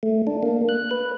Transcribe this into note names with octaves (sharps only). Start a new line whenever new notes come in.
A3
D4
A#3
F#6
B4